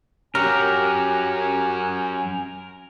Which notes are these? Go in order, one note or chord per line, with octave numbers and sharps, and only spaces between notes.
F#3 C#4 G4 A#4 G#5